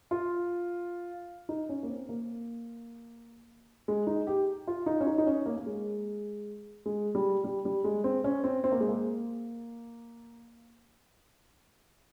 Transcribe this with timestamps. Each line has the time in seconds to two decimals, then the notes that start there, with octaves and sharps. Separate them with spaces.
0.11 F4
1.49 D#4
1.69 C#4
1.83 A#3
1.89 C4
2.09 A#3
3.88 G#3
4.07 D#4
4.27 G4
4.67 F4
4.86 D#4
5.01 C#4
5.07 D#4
5.18 D#4
5.27 C#4
5.46 A#3
5.57 A#3
5.66 G#3
6.86 G#3
7.15 G3
7.44 G3
7.65 G3
7.84 G#3
8.04 C4
8.24 C#4
8.44 C4
8.64 C4
8.72 A#3
8.80 G#3
8.89 A#3